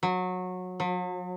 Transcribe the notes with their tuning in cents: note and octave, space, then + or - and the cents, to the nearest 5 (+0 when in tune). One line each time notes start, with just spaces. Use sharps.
F#3 -20
F#3 -45